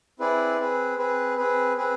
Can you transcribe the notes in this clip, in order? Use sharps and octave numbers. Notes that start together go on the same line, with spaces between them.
C4 E4 G#4 B4 D5
C4 G#4 B4
C4 G#4 B4
C4 G#4 B4
C4 G#4 B4